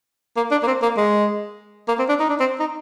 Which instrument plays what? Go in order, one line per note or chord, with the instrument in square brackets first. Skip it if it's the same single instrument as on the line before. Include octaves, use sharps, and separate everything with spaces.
[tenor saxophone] A#3
D4
A#3
C4
A#3
G#3
A#3
C4
D4
D#4
D4
C4
D#4